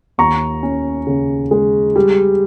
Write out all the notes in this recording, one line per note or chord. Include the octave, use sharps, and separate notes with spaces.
D#2 A#5 C#6
C#4
C#3
G#3
G3